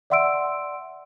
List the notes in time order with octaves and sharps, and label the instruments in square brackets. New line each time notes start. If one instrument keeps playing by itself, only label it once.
[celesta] D5 E5 F#5 C6 E6 D7